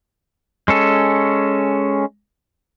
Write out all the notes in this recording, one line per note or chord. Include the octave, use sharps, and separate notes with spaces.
G#3 C#4 A4